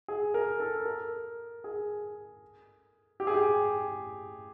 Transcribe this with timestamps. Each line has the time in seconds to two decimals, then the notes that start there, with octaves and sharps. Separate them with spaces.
0.08 G#4
0.34 A#4
0.60 A4
0.85 A#4
1.64 G#4
3.20 G4
3.27 G#4
3.34 G4